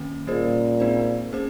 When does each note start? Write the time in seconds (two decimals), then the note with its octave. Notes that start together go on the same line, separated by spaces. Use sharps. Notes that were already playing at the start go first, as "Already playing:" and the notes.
Already playing: D#3 A#3 C#4
0.27 A#2 G3 C#4 G#4 C5
0.80 G#3 C4 D#4 G#4 C5
1.33 A#3 C#4 G#4 C5